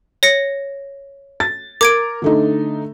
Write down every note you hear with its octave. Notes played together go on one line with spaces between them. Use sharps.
C#5 A#6 C#7
A6
A#4 D6 G#6 D7
D3 A3 D#4